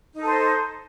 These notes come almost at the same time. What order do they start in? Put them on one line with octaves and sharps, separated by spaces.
D#4 A4 C5